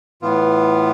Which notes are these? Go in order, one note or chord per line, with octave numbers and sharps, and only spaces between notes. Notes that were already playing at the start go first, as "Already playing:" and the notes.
A2 E3 B3 F4